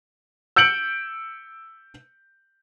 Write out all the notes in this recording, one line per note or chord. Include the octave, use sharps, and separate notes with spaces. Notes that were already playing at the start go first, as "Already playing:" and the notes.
E6 G6 C#7 D7 F#7